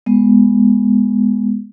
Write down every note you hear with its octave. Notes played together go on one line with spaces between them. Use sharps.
G#3 B3